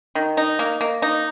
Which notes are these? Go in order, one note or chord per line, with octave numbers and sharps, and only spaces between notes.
D#3
D#4
A#3
A#3
D#4